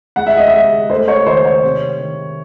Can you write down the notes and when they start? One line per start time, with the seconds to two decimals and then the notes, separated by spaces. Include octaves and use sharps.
0.16 G#3 F#5
0.26 E5
0.37 D#5
0.48 E5
0.53 G#3
0.90 A3 C5
1.08 C#5
1.26 D#3 C5
1.45 C#5
1.64 C3
2.00 D#3